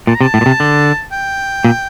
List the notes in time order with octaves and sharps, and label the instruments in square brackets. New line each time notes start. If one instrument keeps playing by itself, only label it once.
[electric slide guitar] A#2 [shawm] A5
[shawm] A#5
[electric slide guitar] C3 [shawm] A5
[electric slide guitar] A2
A#2
C3
D3
[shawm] G5
[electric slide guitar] A#2